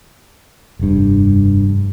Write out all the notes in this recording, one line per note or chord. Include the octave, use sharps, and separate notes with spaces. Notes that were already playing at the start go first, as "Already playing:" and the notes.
F1 G2